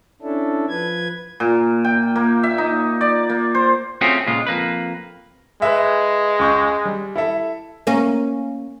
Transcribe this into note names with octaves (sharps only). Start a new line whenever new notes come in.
C#4 D4 E4 A4
F3 B4 G#6
A#2
G5
A#3
E5
D#4
D5
A#3
C5
A3 C4 C#4 F4 F#4 G#4
A#2 C#3 G#3 F4
F2 A#3 B4
G#3 B4 E5
C#2 C#6 G6
G3
E4 A4 E5
A#3 C#4